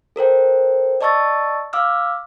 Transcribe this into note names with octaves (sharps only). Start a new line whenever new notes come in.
A4 A#4 C5 G5
D5 D#5 A5 C#6 E6 A6
F5 D6 E6 F6